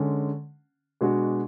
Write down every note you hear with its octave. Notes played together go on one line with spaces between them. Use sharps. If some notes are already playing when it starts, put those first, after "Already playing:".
Already playing: D3 G#3 C#4
B2 G#3 D4 F#4